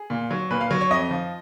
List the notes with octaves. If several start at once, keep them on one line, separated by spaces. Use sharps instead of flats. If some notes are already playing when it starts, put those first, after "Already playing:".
Already playing: G#4
A#2
F#3
A#2 B4
F5
F#3
C#5
F2 D#5
F3